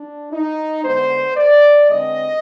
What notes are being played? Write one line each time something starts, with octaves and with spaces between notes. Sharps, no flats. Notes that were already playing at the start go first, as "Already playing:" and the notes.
Already playing: D4
D#4
D3 G#3 B3 C5
D5
D3 G#3 C4 D#5